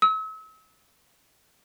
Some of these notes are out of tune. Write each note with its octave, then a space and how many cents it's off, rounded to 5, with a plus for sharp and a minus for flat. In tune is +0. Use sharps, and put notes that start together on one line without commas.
E6 -40